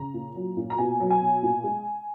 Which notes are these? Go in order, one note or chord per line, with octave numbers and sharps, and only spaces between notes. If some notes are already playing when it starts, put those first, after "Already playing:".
Already playing: C#3 A#5
A#2
F#3
A#2
A#5
B2 G#5
F#3
G#5
B2
A#2
G#3